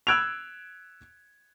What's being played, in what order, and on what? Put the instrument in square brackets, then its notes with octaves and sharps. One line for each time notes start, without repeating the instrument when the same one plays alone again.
[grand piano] E6 F#6 G#6 D7 F7